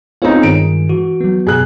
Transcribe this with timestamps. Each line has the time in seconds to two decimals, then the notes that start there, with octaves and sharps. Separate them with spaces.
0.22 B3 C4 D#4 F4 G#4 C#5 F5
0.43 G2 D#3 G#3 D7
0.89 E3 F#4
1.20 F#3 B3
1.47 F#2 B2 G#4 F#6